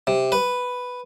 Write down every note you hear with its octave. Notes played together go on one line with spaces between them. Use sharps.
C3
B4